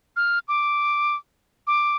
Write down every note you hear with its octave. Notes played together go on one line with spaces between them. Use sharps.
F6
D6
D6